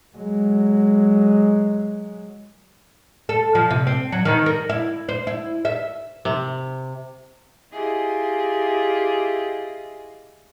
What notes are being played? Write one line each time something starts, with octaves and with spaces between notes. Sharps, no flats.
F#3 G#3
A4
F3
C3
C4
F#3
D#3
A#4
E4
C5
E4
E5
C3
E4 F4 G4 G#4 D#5